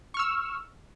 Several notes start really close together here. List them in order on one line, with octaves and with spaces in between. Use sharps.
C#6 F6 E6